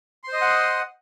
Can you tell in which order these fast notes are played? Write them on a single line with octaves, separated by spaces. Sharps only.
C6 C5 D#5 D#6 F#5